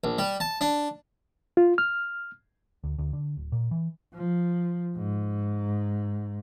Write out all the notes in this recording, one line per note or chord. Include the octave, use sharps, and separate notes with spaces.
A#1
G3
A5
D4
F4
F6
D2
D2
D3
D1
A#2
E3
F3
G#2